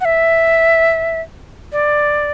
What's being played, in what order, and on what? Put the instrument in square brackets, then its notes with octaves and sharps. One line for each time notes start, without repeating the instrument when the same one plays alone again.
[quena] F#5
E5
D5